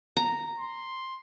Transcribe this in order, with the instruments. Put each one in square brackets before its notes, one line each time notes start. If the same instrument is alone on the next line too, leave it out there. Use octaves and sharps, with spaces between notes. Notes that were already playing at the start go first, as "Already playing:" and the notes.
[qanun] A#5
[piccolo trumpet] C6